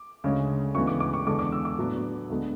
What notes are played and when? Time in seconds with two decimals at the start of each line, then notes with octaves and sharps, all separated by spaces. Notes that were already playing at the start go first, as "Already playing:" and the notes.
Already playing: D6
0.24 D2 C#3 G#3 C#4
0.75 D2 C#3 E3 G#3 B3 C#6
0.87 D6
1.00 D6
1.13 C#6
1.27 E2 D3 G#3 D6
1.39 D6
1.52 E6
1.65 D6
1.78 A2 F#3 B3 D4
2.30 D2 D3 G#3 B3